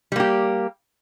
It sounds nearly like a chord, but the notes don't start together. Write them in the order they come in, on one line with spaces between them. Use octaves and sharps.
G3 A#3 G4